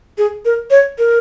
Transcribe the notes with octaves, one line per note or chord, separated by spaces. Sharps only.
G#4
A#4
C#5
A#4